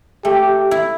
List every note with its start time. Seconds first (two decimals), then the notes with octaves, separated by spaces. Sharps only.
0.25 A3 G4
0.71 E4